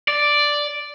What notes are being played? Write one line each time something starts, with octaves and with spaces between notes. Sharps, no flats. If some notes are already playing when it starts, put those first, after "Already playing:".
D5